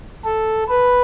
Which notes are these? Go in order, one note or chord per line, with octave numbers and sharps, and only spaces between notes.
A4
B4